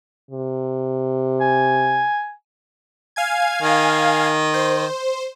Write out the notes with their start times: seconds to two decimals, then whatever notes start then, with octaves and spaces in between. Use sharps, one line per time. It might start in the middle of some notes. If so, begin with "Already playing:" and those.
0.31 C3
1.40 G#5
3.16 F5 G#5 G#6
3.63 D#3
4.54 C5